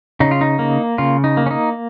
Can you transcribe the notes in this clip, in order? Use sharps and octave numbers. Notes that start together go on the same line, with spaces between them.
C#3 D#4
F4
D#4
A#3
C#3 F4
D#4
A#3
C#4
D#4